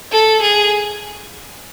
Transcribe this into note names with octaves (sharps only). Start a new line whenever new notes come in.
A4
G#4